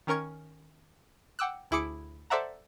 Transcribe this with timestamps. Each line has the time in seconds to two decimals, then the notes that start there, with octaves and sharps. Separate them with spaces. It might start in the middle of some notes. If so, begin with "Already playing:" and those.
0.07 D#3 C#4 A#4 C#6 G#6
1.39 F#5 G5 D6 E6 F#6
1.71 D2 E4 G#4 D6 C#7 D7
2.30 A4 C5 D5 E5 F#5 A#5